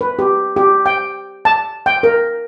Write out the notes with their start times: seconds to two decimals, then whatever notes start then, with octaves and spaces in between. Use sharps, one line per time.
0.01 B4
0.19 G4
0.56 G4
0.86 G5
1.45 A5
1.86 G5
2.03 A#4